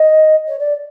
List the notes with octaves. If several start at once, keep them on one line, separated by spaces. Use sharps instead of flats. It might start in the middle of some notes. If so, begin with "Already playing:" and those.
Already playing: D#5
C#5
D5